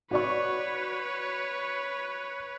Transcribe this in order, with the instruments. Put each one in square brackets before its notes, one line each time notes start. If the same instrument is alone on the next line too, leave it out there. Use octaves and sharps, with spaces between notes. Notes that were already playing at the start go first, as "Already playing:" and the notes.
[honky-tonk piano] F#4 D5 C#6 [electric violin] B4 C#5